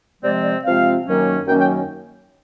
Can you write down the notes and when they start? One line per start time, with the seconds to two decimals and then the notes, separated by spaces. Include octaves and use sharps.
0.22 C3 F3 G#3 C4 D5
0.43 D5
0.64 C3 F3 G#3 C4 F5
1.06 F#2 D#3 F#3 A#3 C#4
1.47 F#2 D#3 F#3 A#3 C#4 G5
1.58 G5